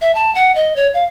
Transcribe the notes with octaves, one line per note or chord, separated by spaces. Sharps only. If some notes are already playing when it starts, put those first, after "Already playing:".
E5
A5
F#5
D#5
C#5
F5